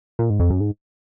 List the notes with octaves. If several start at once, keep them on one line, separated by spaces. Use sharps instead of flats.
A#2
G#2
F2
F#2
G#2